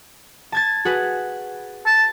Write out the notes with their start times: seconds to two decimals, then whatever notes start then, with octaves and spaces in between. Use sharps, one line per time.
0.52 A5 G#6 A6
0.85 F#4 G#4 B4
1.86 A5